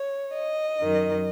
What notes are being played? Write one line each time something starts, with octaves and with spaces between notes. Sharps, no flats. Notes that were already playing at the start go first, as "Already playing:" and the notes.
Already playing: C#5
D#5
F#2 D#3